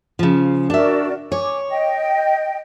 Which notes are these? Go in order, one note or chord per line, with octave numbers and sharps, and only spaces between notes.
C#3 F3
D4 F#4 A#4 D5 E5
C#5 G#5 D6
D#5 G5